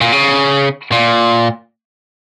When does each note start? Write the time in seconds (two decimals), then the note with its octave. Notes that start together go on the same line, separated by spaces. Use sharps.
0.01 A#2
0.12 C#3
0.92 A#2